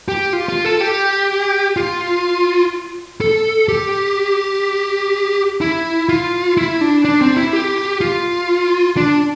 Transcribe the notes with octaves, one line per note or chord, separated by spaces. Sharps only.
G4
F4
F4
A4
G4
F4
A4
G4
E4
F4
E4
D4
D4
C4
E4
G4
F4
D4